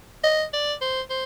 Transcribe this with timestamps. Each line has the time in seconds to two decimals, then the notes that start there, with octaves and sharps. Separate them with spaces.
0.24 D#5
0.53 D5
0.81 C5
1.10 C5